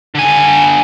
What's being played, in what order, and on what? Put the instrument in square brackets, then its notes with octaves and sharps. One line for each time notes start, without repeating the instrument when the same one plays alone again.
[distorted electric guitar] D3 G#5